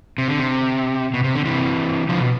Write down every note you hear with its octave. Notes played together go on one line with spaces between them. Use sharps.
C3
D3
C3
B2
C3
D3
C3 E3
D3 F3
B2